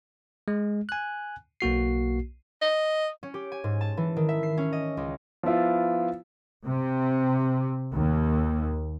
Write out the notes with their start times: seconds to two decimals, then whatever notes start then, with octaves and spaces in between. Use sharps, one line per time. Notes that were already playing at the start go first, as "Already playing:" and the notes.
0.48 G#3
0.89 G#5 F#6
1.61 B1 A#3 F#4 C7
2.62 D#5
3.23 C#4
3.34 G4
3.52 G#5
3.64 G#2
3.81 A5
3.97 E3
4.16 D#3
4.29 E5
4.43 C7
4.58 C#4
4.73 D#5
4.97 C#2
5.43 F3 B3 E4 F4
6.67 C3
7.93 D#2